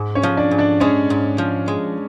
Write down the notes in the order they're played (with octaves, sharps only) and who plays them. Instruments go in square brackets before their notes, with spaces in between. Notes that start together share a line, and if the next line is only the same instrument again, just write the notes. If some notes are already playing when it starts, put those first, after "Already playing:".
Already playing: [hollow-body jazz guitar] G#2
[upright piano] C#4 C#5
[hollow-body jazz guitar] F3
[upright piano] D4 D5
[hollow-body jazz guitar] G#2
[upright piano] D4 D5
[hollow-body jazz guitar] G#3 [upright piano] C#4 C#5
[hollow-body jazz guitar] G#2
F3
G#3